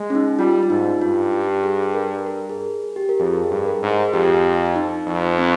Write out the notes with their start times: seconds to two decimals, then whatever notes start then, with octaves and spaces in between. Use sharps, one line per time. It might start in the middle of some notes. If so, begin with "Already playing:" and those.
Already playing: G#3
0.10 C#4
0.15 D#4
0.39 G3 F4
0.63 F4
0.70 G#2 D#4
1.01 G2 F4
1.33 G4
1.64 G#4
1.95 A#4
2.26 A#4
2.49 G#4
2.96 G4
3.09 A#4
3.20 F2 G#4
3.44 G#4
3.51 G2
3.66 A#4
3.82 G#2
3.90 G#4
4.13 F2 G4
4.76 D#4
5.07 F2
5.39 C4